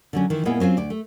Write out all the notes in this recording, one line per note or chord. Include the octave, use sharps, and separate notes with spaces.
D3 F#3 C#4
D#3 E3
A#2 G#3 A#3 B3 E4
F#3 C4 C#4 F4
D2 D5
A3